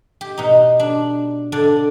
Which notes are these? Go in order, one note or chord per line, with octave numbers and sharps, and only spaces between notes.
G4
B2 D#4
D4
D3 D4 D5